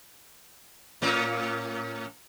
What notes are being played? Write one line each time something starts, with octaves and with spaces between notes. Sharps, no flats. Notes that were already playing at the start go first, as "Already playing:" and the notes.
A2 A#3 C#4